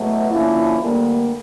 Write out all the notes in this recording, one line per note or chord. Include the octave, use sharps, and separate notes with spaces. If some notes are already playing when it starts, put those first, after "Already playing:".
Already playing: E2 B2 F#3 A3
D3 F3 A#3 C#4 E4
D2 D3 G3 A#3